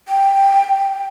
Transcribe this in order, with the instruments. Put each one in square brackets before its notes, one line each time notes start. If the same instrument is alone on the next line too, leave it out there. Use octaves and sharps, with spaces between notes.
[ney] G5